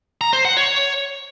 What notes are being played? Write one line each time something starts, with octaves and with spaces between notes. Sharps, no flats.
A#5
C5
F#5
C#5